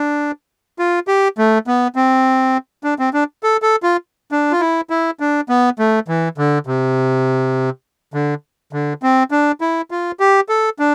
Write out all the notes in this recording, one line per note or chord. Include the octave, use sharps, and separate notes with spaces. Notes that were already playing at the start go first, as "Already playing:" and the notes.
Already playing: D4
F4
G4
A3
B3
C4
D4
C4
D4
A4
A4
F4
D4
F4
E4
E4
D4
B3
A3
E3
D3
C3
D3
D3
C4
D4
E4
F4
G4
A4
D4